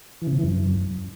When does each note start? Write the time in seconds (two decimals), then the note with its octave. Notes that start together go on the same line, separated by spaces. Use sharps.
0.22 E3
0.27 C#3
0.33 C3
0.38 E3
0.44 F#2